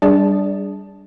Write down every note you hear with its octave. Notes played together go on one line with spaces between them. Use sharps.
G3 D4 G#4 D5